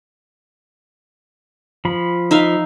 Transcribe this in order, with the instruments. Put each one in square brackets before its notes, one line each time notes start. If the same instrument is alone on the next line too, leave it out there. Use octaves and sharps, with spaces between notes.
[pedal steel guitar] F3 B5
[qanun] D#4 E5 F5